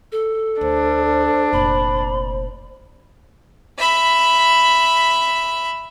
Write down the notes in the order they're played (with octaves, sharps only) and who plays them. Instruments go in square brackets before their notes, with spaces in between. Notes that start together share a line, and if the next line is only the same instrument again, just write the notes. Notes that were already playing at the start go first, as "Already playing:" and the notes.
[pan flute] A4
[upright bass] D2 [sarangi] D4 [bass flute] C5
[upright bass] F1 A#2 [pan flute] B5
[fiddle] E5 B5